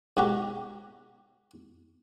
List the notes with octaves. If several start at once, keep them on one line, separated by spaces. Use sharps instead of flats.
G#2 F#4 G4 A#5